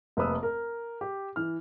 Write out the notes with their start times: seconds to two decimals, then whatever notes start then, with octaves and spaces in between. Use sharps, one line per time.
0.17 F1 A#3 B4 D#6 E6
0.43 A#4
1.01 G4
1.36 E3 F6